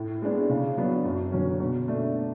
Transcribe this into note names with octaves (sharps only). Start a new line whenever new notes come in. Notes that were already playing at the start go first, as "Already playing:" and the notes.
Already playing: A2
G#3 B3 D4
C#3
F#3 B3 D4
F#2
D3 F#3 C#4
B2
A3 D4